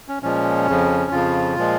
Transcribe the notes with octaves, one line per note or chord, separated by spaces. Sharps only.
C#4
A#2 F3 G#3 C#4
F2 C#3 F3
F2 C#3 F3 F4
A#2 F3 G#3